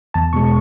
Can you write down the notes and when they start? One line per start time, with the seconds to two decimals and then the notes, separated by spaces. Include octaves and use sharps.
0.14 E2 A5
0.33 B2 G#3 C#6